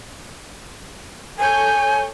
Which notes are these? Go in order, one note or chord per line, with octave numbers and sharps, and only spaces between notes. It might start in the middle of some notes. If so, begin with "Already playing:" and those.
A4 C#5 G#5 G6